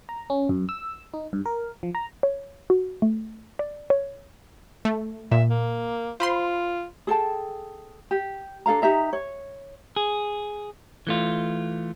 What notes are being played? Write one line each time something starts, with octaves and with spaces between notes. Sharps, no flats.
A#5
C#4
F#2
E6
D#4
G2
A#4
F3
A#5
C#5
F#4
A3
D5
C#5
A3
A#2 E5
A#3
F4 C5 B5 C6
G#4 A4 G5 A5
G4
D4 A4 F5 A#5
D#4 G4 E5 A#5
C#5
G#4
E3 A3 F4